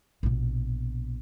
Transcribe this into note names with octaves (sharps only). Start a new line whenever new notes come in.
A#1 B2